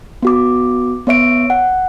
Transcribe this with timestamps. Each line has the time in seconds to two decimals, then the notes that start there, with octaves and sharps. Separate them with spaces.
0.23 B3 F#4 D6
1.07 B3 C#5 E5 D7
1.50 F#5